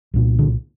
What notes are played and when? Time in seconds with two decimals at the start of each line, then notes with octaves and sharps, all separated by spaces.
0.14 C2 A#2
0.39 D3